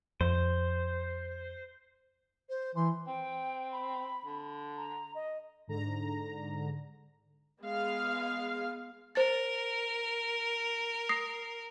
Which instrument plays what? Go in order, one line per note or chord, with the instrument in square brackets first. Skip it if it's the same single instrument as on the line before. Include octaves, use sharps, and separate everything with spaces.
[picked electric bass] F2 [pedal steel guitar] C5
[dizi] C5
[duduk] E3 [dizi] C6
[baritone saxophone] C4 [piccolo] G5
[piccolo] B5
[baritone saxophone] D3
[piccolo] A#5
D#5
[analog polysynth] G#2 D3 A#5
[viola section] G#3 B3 F5
[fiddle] A#4 [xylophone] C5 A6
[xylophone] D#6 A#6 C7